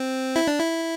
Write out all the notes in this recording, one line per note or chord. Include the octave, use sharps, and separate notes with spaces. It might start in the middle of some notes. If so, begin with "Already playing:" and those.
Already playing: C4
E4
D4
E4